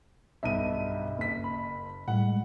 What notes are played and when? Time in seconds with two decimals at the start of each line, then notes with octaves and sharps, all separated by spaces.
0.43 B1 G2 D#5 E5 D#7
1.18 F#1 B6
1.44 B5
2.08 A2 G3 G#3 F#5